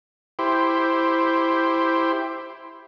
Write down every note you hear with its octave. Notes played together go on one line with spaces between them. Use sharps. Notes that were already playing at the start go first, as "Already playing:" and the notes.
E4 G4 C5